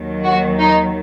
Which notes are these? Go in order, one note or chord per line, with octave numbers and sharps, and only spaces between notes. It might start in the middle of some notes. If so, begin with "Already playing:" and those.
Already playing: D#2 D#3 F#3
F#4
D#4